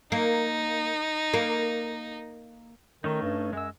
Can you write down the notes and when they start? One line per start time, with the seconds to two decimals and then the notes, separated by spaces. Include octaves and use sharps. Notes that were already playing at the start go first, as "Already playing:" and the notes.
0.12 A#3 D#4
1.34 A#3
3.04 D#3 A3 C#4 D#4
3.22 G2
3.53 F#2 G#3 E6